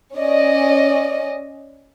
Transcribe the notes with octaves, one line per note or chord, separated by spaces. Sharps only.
C#4 D5 D#5